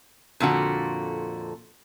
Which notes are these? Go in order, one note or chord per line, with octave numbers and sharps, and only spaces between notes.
F2 A#2 D3 F#4